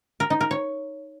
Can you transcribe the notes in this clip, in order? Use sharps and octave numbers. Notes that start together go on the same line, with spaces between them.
A#4
D#4
A#4
C#5